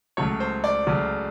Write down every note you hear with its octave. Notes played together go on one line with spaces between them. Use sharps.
C#2 C#3 F#3 A3 C#5
C5
D5
C#2 C#3 F#3 A3